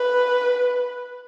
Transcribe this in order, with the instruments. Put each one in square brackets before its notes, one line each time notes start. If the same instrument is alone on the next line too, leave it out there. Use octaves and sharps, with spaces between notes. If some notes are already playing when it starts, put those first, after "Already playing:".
Already playing: [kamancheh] B4